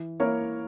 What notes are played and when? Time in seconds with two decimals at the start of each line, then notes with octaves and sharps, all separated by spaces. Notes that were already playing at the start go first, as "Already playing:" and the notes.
Already playing: E3
0.20 A#3 E4 A#4 C#5